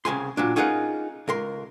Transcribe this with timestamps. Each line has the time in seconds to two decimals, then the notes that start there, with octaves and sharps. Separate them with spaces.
0.05 C2 C#3 G#5 C6
0.37 A#2 F#3 D4
0.56 C#4 D#4 F4 G#4 A#4 F#5
1.28 C#2 A#4 C6